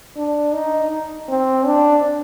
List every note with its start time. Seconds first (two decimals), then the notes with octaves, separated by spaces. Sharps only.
0.17 D4
0.54 D#4
1.29 C4
1.66 D4